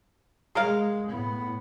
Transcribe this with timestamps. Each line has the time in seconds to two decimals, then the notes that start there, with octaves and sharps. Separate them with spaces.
0.55 G#3 G#4 A#4 F5
1.10 A2 B3